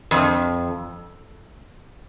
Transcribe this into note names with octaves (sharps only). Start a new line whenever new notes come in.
F2